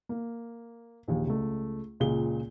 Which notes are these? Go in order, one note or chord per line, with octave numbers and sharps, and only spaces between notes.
A#3
A#1 D#2
C#2 A3
C#2 A#2 G#4 G7